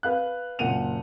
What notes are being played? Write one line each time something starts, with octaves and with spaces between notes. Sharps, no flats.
B4 F5 F#6
F#1 A#2 F#5 D#7 F7